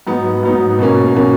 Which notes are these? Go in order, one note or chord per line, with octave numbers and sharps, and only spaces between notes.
G#2 F#3 B3 D#4
G#2 F#3 B3 D#4
B2 A#3 C#4
B2 A#3 C#4